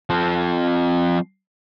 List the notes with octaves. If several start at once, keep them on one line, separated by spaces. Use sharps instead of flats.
F3 C4